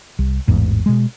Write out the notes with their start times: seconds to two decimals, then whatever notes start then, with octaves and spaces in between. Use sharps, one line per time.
0.19 C2
0.48 A1 E2 G#2
0.86 B2 G#3